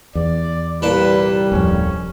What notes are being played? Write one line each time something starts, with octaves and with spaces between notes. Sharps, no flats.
E2 D5
C2 A#2 G3 B4 A5
D1 F2 C#4